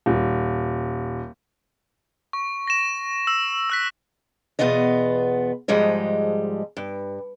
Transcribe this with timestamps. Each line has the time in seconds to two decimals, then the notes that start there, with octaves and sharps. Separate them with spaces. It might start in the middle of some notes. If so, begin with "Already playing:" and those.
0.06 D#1
2.33 C#6
2.67 A#6 E7
3.27 E6
3.70 E6 F#6 B6
4.59 E2 G#2 B2 B3 F4 D#5
5.68 G#2 F3 G3 G#3 D#5
6.77 G2